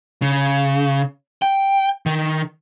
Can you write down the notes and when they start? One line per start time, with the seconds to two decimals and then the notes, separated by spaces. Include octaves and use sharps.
0.22 C#3
1.42 G5
2.06 D#3